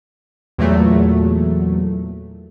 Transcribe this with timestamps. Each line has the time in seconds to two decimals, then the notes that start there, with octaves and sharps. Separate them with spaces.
0.58 E2 A#2 F#3 A3